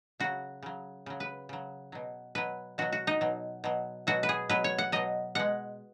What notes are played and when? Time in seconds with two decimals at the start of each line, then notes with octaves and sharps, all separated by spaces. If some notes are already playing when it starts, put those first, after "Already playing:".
0.20 C#3 F#3 F#4
0.62 C#3 F#3
1.06 C#3 F#3
1.20 B4
1.49 C#3 F#3
1.92 B2 F#3
2.35 B2 F#3 B4
2.78 B2 F#3 F#4
2.92 F#4
3.07 D#4
3.21 B2 F#3
3.64 B2 F#3
4.07 B2 F#3 F#4
4.23 B4
4.29 G#4
4.49 B2 F#3 B4
4.64 C#5
4.78 F#5
4.92 B2 F#3 D#5
5.35 B2 G#3 F#5